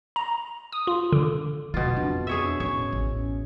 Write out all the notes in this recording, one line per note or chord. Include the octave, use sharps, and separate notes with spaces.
A#5
D#6
F4
D3
E2 B2 F#3 G3 F4
F2 D4
G#4 C#5 E5
A2 C#4 C#5
A1